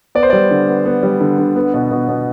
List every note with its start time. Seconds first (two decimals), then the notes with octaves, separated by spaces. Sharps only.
0.15 B3 D5
0.23 C5
0.30 G3 D5
0.51 D3
0.68 B3
0.86 B3
1.03 G3
1.21 D3
1.39 D3
1.56 B3
1.74 B2
1.91 B2
2.08 B2